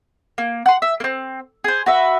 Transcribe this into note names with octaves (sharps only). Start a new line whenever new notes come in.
A#3
F#5 C6
E5
A#3 C4
G#4 C5
F#4 B4 E5